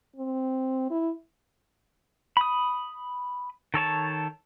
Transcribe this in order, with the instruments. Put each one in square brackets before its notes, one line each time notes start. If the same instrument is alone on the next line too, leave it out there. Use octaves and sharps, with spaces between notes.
[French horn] C4
E4
[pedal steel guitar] B5 D#6
D#3 A4 C#5 A5